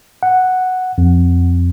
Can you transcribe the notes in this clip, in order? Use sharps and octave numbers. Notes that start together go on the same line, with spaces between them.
F#5
F2